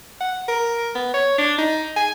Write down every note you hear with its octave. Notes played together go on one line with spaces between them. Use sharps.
F#5
A#4
B3
C#5
D4
D#4
G#5